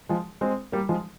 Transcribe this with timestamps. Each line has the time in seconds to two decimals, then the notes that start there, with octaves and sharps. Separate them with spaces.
0.09 F3 G#3
0.41 G#3 C4
0.72 G3 A#3
0.89 F3 G#3